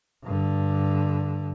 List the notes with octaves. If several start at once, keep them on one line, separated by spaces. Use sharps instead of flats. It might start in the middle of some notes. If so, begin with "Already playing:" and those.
G2 D3